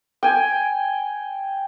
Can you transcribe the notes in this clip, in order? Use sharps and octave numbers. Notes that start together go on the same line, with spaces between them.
G5 G#5